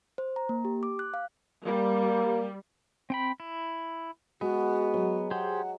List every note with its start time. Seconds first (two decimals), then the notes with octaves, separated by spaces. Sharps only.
0.18 C5
0.36 A#5
0.49 A#3
0.65 G4
0.83 D6
0.99 F#6
1.14 F5
1.65 G3 A#3
3.10 C4 G5 B5
3.40 E4
4.41 G#3 B3 F#4
4.94 F#3
5.31 G4 G#4 C5 F#5